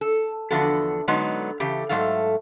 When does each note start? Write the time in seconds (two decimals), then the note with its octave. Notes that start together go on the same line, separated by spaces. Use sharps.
0.01 A4
0.50 E2 D3 F3 B3 F#4 A4
1.08 D3 F#3 G#3 B3 D#4
1.60 C#3 E3 G4 A4
1.89 G#2 F#3 A3 A4 F5